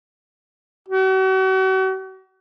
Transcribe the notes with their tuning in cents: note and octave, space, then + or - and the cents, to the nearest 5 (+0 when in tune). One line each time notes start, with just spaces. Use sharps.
F#4 +40